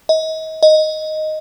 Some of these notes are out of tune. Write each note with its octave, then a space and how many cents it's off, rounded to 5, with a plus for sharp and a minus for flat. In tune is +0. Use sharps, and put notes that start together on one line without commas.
D#5 +35
D#5 +0